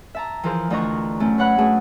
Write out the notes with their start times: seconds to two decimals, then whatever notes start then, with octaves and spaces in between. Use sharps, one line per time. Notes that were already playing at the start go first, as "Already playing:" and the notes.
0.15 E5 A5 A#5
0.43 E3 F3 G#4 A#4 C5
0.70 D2 E3 F4 D#5 A#5 C#6
1.20 F#2 A3 C#4
1.38 B4 C#5 F#5 B5 F#6
1.58 A3 D4 F#4 G#4 B4 G#5